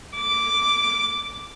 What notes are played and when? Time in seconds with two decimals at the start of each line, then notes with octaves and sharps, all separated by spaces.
0.15 D6